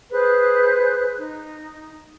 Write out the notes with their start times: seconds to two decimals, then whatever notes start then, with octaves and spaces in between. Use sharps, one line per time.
0.11 G#4 B4 C5 F#6
1.17 D#4